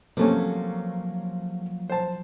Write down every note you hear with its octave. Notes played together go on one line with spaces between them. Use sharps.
C3 F3 F#3 A3 A#3 C#4
C5 A5